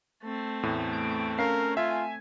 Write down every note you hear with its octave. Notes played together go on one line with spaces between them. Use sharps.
A3 C4
E2 A2
D7
C#4 A#4 F5 C7
F4 E5 G#5